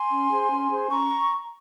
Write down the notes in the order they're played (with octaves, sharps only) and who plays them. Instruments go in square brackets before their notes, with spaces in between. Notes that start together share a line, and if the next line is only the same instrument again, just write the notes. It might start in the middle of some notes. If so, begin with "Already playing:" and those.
Already playing: [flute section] G#5 C6
C#4
G#4 C5
C#4
G#4 C5
C#4 A#5 C#6